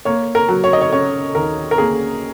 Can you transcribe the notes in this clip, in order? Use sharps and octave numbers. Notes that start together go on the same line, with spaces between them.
A#3 C#5
A#4
F#3
C#5
D#5
C#5
C#3 C#5
D#2 A#4
A#4
A#3 G#4